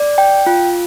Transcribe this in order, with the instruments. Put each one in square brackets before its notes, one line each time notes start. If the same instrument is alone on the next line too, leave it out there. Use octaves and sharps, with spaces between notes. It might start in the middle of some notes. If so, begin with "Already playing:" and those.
Already playing: [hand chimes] D5
G5
F4